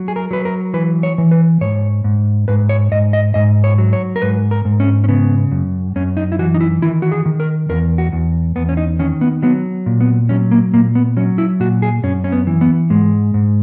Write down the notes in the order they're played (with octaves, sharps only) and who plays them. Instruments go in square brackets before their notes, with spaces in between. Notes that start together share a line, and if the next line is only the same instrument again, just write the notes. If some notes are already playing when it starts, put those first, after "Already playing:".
Already playing: [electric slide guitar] F#3
G#4
A#4
F#3 B4
A#4
E3 B4
C#5
E3
B4
G#2 C#5
G#2
G#2 B4
C#5
G#2 D#5
D#5
G#2 D#5
C#5
F#3
C#5
A#4
G#2 B4
A#4
G#2
C#4
C#4
C#3 B3
F#2
F#2 C#4
D#4
E4
E3 F#4
D#4
E4
D#3 E4
F#4
G#4
D#3
A#4
E2 A#4
F#4
E2
E2 B3
C#4
D#4
D#3 C#4
B3
F#3 B3
A#2
B3
F#3 C#4
A#3
A#2 A#3
B3
F#3 C#4
E4
A#2 F#4
G#4
F#2 C#4
C#4
B3
E3
B3
G#2 G#3
G#2